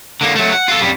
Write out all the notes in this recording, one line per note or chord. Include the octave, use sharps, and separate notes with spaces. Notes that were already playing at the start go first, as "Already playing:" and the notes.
D3 A#3
F#3 A3
F#5
F4 A4
F2 G3